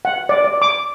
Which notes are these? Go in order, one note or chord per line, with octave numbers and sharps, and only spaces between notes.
F#5
D5
D5
D6